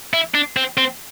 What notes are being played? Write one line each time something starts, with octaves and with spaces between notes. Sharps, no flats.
E4
D4
C4
C4